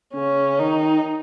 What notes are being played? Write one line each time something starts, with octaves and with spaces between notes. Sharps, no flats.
C#3 C#4
D#3 D#4